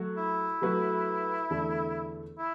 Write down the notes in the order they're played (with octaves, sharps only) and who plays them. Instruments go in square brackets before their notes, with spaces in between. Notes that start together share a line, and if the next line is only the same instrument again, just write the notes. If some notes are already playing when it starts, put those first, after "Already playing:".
Already playing: [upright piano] F#3 A3 F#4
[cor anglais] E4
[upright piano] F#3 A3 F#4 B4
E2 D3 A3 D4 A4
[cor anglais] E4